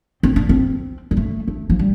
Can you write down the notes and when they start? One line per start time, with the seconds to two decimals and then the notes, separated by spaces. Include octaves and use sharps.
0.23 C4
0.36 D4
0.49 C4
1.11 G3
1.17 A3
1.48 A3
1.70 F3
1.79 G3